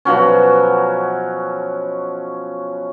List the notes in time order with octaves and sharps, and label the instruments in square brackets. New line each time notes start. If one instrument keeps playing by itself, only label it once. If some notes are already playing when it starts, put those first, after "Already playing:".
[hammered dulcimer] B2 F3 F#3 C#4